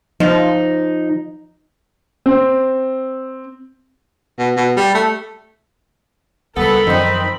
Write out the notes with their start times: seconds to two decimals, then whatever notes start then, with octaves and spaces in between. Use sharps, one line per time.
0.20 F3 D#4
2.26 C4
4.38 B2
4.57 B2
4.77 G3
4.95 A3
6.56 C#2 F#3 G3 B3 A4 A#4 B5
6.87 F#2 D#3 F3 C4 D#4